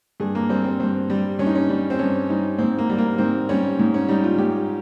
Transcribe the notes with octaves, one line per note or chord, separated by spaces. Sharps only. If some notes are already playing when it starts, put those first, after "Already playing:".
G2 G#4
A#3
G3 C4
C4
G2 C4
G3
G2 C#4
D#4
C#4
G3
C4
G2 C#4
G3 D#4
G#2 C4
A#3
G3
A#3
G#2 C4
G3 C#4
G#2
C#4
G3 D#4
F4
G#2 G4